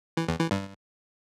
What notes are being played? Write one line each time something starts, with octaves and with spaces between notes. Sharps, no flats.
E3
E2
E3
G2